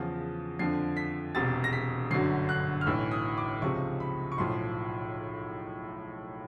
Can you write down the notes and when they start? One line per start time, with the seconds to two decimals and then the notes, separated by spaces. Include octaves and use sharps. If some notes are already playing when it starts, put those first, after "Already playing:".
Already playing: E2 C#3 F3
0.59 F2 D3 F3 C7
0.97 B6
1.35 E1 E2 C3 A6
1.64 A#6
1.73 B6
2.11 G1 F#2 D3 F#3 C7
2.49 F#6
2.81 F6
2.86 B1 A2 E3 E6
3.11 D#6
3.38 D6
3.62 C#2 C3 F3 C#6
4.00 B5
4.32 C#6
4.38 B1 A2 F3 C6